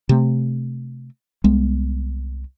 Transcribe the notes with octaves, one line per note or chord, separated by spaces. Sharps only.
C3 A3
C2 G#3 B3